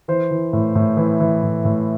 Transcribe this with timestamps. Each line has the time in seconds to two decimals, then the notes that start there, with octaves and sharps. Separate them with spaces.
0.08 E3 C5
0.31 E3
0.53 A2
0.75 A2
0.97 E3
1.20 E3
1.43 A2
1.65 A2